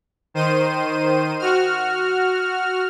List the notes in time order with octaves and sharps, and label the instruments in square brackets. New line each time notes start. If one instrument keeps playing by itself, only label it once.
[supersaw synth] D#3 C5 D#7
F#4 F6